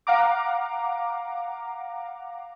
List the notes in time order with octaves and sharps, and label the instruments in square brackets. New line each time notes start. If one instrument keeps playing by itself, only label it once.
[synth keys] F5 F#5 A#5 D6